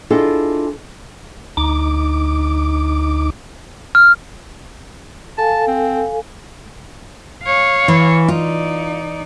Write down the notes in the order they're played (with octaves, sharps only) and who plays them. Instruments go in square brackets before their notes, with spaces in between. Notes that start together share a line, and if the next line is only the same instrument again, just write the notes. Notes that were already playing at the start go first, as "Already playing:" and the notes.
[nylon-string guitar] D4 E4 F4 G#4 A4 D#5
[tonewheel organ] D2 D#4 D6
[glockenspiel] F6
[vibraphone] A4 F5 G#5 [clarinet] A5
[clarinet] C4
[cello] C#5 F5
[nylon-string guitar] E3
[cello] D#4 D5 [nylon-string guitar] F4